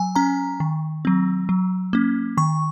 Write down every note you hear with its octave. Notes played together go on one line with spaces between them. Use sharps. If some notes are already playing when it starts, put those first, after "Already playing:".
Already playing: F#3 G#5
C#4 A#5
D#3
F#3 C4
F#3
A#3 C#4
D#3 C#6